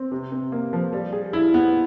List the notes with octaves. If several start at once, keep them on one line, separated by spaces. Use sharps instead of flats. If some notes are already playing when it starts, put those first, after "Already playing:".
Already playing: C4
C3
C3
A#3
F3
G3
G#4
E4
B3